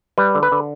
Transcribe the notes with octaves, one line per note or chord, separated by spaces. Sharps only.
G3 B4
D3
B4
D3